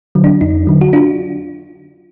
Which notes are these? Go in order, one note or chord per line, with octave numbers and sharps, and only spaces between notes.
D3 F#3
D4
F2 D#4
D3 F#3
F#4
D4 F4